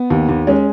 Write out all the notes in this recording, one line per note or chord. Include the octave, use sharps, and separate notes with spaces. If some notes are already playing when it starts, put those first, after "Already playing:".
Already playing: B3
D#2
D#2
G#3 C#4